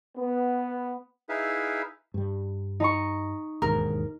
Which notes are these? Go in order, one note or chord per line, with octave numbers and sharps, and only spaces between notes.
B3
D#4 E4 G#4 B4 E5 F5
G2 G3
D#4 A#5 C#6
E1 D#2 G#2 A#4